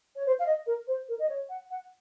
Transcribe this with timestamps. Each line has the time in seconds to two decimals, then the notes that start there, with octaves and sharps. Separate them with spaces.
0.16 C#5
0.26 C5
0.39 F5
0.46 D#5
0.67 A#4
0.87 C5
1.09 A#4
1.19 D#5
1.29 C#5
1.49 F#5
1.71 F#5